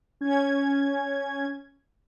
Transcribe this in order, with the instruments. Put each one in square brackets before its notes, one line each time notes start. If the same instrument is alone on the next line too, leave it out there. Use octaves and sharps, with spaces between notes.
[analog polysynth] C#4 G#6